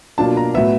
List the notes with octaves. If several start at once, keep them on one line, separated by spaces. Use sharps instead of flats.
B2 F#3 A#3 D4 F4 A5
A#5
A2 F#3 B3 E5